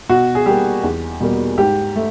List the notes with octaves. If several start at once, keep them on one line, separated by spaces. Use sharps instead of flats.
B2 F#4
G#4
G3 A#3 G4
E2
B2 G3 A#3
G#2 G4
A3